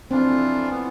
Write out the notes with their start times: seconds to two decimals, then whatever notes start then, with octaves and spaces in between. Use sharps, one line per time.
0.10 F2 E3 A3 C4 D4 F4
0.70 E3 B3